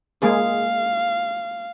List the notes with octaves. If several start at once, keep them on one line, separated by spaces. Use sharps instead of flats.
G#3 A#3 G#4 F5